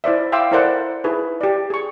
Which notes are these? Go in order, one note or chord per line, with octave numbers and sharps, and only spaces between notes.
E4 C5 D5 E5
E5 F5 G5 C6 D6 E6
E4 A4 A#4 C5 D5 F#5
D#4 E4 G#4 B4
G4 D5
G#4 C#6